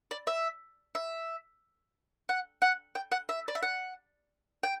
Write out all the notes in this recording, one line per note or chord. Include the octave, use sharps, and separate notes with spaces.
D5
E5
E5
F#5
F#5
G5
F#5
E5
D5
E5
F#5
G5